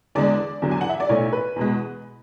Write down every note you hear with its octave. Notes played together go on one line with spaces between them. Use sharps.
E2 D3 G#3 D5
E2 D3 F#3
G#5
F#5
E5
D5
B1 A2 E3 A3 C#5
B4
E2 B2 G#3